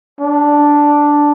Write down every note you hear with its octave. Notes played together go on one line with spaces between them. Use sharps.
D4